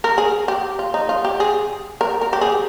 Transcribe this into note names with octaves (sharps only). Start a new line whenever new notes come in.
A#4
G#4
G4
F4
D#4
F4
G4
G#4
A#4
A#4
G4
G#4